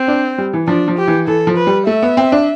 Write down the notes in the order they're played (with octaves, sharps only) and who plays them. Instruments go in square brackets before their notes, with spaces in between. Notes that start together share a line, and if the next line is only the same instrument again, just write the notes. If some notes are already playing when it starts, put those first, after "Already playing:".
Already playing: [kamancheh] C4
[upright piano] D4
G3
E3
[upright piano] F3 [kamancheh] D4
[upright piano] F3
[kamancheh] G4
[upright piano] E3
[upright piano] E3 [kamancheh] A4
[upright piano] F3
[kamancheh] B4
[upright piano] G3
[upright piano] A3 [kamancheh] E5
[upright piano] B3
C4
D4